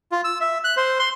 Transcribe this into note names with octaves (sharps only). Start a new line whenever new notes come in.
F4
E6
E5
F#6
C5
C6